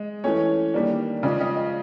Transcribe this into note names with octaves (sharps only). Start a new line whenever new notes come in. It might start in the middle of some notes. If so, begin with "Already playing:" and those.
Already playing: G#3
E3 A3 C#4 C#5
D#3 G3 A#3 D4
C#3 F3 G#3 D5
D#5
D#5